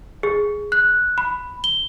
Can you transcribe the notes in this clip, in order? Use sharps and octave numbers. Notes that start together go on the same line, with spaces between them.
G#4
F#6
B5
G7